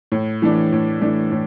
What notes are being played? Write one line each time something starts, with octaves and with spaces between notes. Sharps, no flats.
A2
E3 A3 D4
A2
E3 A3 D4
A2